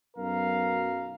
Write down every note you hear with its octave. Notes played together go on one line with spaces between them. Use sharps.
B1 F#2 B2 A#4 F5 A#5